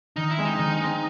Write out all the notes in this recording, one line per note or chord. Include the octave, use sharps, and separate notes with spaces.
D#3 D#4
E4
G#3 C4
D#4
D#3
G#3 C4